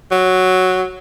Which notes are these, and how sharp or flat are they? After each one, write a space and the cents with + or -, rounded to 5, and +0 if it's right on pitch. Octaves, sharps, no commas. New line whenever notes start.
F#3 +0